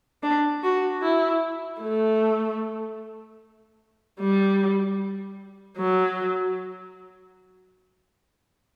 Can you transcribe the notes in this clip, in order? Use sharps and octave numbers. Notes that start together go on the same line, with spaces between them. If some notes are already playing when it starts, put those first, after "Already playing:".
D4
F#4
E4
A3
G3
F#3